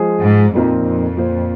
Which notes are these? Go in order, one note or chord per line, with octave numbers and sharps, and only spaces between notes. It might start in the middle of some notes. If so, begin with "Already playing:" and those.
Already playing: F3 G#3 F4 G#4 C5
G#2
F2 A#2 F3 C4 D#4 A#4
F2
A#2 A#3 F4 C5